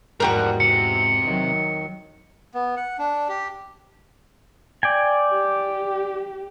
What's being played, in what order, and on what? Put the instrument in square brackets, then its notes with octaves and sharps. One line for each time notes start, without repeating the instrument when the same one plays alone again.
[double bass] E2 G#2 [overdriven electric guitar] F3 G3 [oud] F#4 G4 A#4
[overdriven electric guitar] C3 [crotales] C#7
[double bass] D#3 F#3
[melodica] B3
F#5
D4
G4
[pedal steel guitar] D5 G5 G#5
[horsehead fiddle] G4